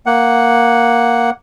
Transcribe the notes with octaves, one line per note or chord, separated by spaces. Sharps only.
A#3 F#5